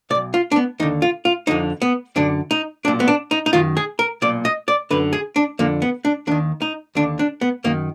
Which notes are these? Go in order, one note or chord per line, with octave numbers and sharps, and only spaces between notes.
B2 D5
B1
F4
D4
B3
D#2 D3 D#4
F4
F4
F2 D3 D#4
B3
F#2 D3 D4
D#4
B1 A#2 D4
B3
D4
D#4
D#4
F#2 D#3 F4
G#4
A#4
B1 A#2 D5
D#5
D5
F#2 D3 B4
G#4
D4
F2 D3 A#3
B3
D4
D#2 D#3 D4
D#4
D#2 D3 D4
D4
B3
F#2 D#3 A#3